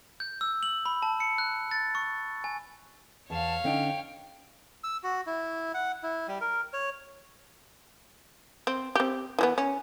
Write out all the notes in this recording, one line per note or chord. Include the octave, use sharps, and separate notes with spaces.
G6
E6
F#7
B5
A5
C#7
F#6
A6
C#6
G#5
E2 C#5 F5 A5
D3 C#4 D#4 G5
E6
F#4
E4
F#5
E4
G3
A#4
C#5
C4
C4 G4
E3 G3 B3
C#4